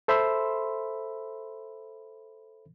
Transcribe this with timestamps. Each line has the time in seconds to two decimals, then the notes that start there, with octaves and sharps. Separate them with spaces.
0.08 A4 C5 E5 B5 C6 E6